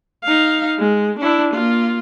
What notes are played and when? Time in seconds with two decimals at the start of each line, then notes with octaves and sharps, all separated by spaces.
0.23 D#4 F5
0.79 G#3
1.19 D4 E4
1.54 A#3 F4